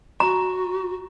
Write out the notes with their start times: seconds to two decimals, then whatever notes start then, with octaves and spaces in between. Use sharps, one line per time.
0.20 F#4 A#5